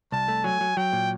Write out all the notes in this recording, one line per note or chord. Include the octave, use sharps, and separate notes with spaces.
C2 A5
A3
F#3 G#5
F#3
F#3 G5
A#2